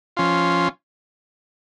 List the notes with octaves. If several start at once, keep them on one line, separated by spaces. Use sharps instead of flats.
F3 C#4 F4